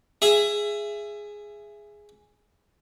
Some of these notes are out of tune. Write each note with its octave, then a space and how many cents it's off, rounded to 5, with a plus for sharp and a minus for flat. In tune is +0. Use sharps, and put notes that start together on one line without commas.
G#4 +0 E5 +20